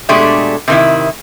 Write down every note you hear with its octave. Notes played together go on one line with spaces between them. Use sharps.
B2 G#3 A3 D4 G4
C3 D#3 E4